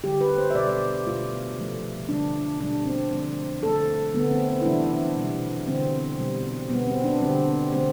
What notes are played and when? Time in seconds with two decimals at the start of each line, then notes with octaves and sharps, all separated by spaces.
0.04 D3 G3 G4
0.21 B4
0.38 C5
0.50 E5
0.55 B2 G3 D5
1.07 B2 A3 F4
1.58 C3 F3 A3
2.09 D3 G3 D4
2.60 B2 G3 D4
2.86 C4
3.11 D3 F3 A3
3.63 D3 A3 A4
4.14 D3 A3 B3
4.31 C4
4.49 C4
4.61 E4
4.65 C3 E3 G3 D4
5.16 B2 G3
5.68 D3 G3 C4
6.19 B2 G3
6.70 B2 G3 B3
6.87 C4
7.04 D4
7.21 D3 G3 C4
7.72 D3 A3 C4